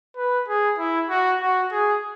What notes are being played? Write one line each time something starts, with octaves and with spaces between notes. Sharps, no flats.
B4
G#4
E4
F#4
F#4
G#4